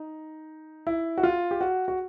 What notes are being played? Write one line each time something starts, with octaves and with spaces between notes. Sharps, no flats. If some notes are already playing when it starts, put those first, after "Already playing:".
Already playing: D#4
E4
F#4
F4
G4
F#4
F#4